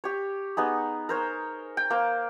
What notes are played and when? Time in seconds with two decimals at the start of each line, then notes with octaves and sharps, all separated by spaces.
0.04 G4 C#5
0.57 B3 D#4 G#4
1.09 A#4 C5 C#5
1.77 G5
1.90 A#3 C5